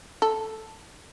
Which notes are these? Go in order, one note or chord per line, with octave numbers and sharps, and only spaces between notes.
A4